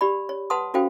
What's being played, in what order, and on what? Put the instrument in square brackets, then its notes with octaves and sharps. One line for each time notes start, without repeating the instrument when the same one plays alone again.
[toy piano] G4 D5 B5
C#5
B4 F#5 A5 C6 D#6
C#4 F#4 A4 C5 F5 G5